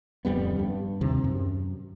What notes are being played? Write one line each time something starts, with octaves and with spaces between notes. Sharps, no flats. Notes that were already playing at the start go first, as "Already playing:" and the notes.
D1 F2 G3 B3
G2
D#2 C3
F#2